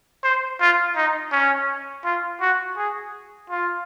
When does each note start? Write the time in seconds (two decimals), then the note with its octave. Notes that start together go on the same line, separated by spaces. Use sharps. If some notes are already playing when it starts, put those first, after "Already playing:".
0.24 C5
0.61 F4
0.96 D#4
1.32 C#4
2.05 F4
2.41 F#4
2.77 G#4
3.50 F4